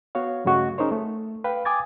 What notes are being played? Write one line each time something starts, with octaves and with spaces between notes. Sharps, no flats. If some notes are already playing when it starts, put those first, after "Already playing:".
B3 F#4 C#5 F5
G2 C#3 F#3 A3 F#4 D#5
C#4 D#4 G#4 A#4 C5 C#5
A3
B4 F5 G5
G5 G#5 D6 D#6 G#6 A6